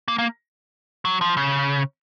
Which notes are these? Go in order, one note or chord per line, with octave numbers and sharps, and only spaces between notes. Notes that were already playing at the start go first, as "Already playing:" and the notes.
A#3
A#3
F#3
F3
C#3